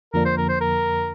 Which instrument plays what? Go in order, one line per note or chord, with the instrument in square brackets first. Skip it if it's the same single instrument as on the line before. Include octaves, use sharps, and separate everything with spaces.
[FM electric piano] F2 D3 F3 A#3 D4 [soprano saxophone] A#4
[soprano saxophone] C5
A#4
C5
A#4